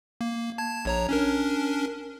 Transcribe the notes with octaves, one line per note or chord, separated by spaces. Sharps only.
A#3
A5 G#6
A#1 C#5 A#5
C#4 D4 A#4